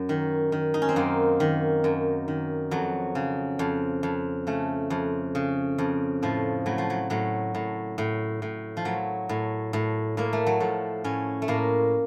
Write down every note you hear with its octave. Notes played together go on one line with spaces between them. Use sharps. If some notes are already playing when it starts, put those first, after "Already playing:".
Already playing: F#2
D#3
D#3
D#4
C#4
C4
F#2 A#3
D#3
F#2
D#3
F2 F#3
C#3
F2
F2
C#3 A3
F2
C#3
F2
A2 F3
A2 F#3
F3
F#3
A2 F#3
A2
A2
A2
F3
A2 F#3
A2
A2
A2 A#3
A3
F#3
A2 F3
A2 C#4
A3
A2 A#3